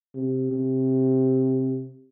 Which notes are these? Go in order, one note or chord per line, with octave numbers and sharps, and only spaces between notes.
C3
C3